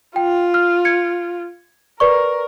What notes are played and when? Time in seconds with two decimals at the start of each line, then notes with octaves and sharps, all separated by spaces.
0.16 F4 G5
0.54 F6
0.85 G#6 C#7
2.00 A#4 B4 D5 C#6